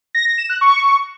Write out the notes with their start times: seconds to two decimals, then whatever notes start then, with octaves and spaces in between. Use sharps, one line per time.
0.15 A#6
0.26 A#6
0.38 E7
0.49 F#6
0.61 C#6